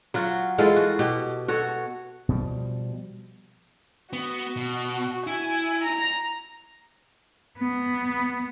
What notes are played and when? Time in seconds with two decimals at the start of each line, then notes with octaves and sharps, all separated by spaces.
0.14 F#3 F4 F#4
0.58 E3 G#3 F4 A4
0.76 F#4
0.99 B2 G4
1.48 F#4 A4 C#5
2.29 B2 F3 G3
4.13 B3 F#4
4.57 B2
5.27 E4 G#5
5.84 A#5
7.57 B3